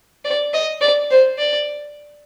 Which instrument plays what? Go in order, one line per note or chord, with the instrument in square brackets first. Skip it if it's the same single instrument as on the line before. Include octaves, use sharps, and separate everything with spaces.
[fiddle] D5
D#5
D5
C5
D5